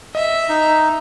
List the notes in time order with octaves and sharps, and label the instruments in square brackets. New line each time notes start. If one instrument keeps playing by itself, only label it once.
[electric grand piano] D#5 [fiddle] E5
[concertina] D#4